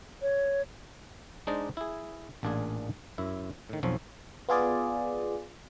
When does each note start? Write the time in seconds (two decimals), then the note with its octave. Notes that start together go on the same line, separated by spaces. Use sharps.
0.22 C#5
1.47 G#3 D4 D#4 C5 D5 D#5
1.77 E4 G#4
2.43 A1 A#2 D4 F4 G#4 G#5
3.18 F#2 E4
3.69 A2 D#3
3.83 B1 F2 F3 C#5
4.49 B3 F4 G#4 D5